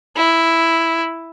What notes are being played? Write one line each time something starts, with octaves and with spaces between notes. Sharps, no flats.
E4